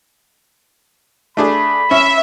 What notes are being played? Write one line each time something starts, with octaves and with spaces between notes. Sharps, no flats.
A3 D4 G#4 B5
C#4 E5